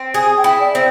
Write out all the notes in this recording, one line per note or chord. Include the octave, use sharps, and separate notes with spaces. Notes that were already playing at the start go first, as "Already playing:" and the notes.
Already playing: C4
G#4 G#5
G5
E4
D5
C4